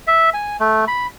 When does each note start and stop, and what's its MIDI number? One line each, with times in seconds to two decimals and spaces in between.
0.07 0.30 76
0.34 0.57 80
0.60 0.85 57
0.88 1.07 83